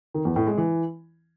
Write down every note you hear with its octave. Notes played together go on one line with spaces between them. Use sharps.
D#3
E2
A2
G#3
E3